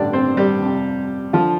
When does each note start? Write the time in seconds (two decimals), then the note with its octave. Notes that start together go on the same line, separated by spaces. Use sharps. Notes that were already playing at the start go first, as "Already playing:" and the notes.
Already playing: A1 G2 D3 D4 D5
0.13 C4 C5
0.37 G3 G4
0.61 F2 C3
1.33 D3 F3 F4